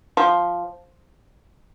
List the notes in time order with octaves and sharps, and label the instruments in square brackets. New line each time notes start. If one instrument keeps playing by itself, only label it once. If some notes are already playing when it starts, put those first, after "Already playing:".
[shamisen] F3